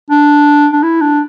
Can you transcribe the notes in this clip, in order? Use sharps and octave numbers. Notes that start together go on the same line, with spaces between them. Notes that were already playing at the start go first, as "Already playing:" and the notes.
D4
D4
E4
D4